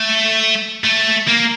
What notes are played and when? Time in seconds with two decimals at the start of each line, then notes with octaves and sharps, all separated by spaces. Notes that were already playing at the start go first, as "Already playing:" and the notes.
Already playing: A3
0.84 A3
1.28 A#3